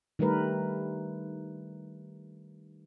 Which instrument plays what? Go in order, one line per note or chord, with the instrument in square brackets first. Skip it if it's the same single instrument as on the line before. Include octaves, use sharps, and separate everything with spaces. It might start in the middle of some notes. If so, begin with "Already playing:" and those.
[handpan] D#3 G3 A3 A#4 B4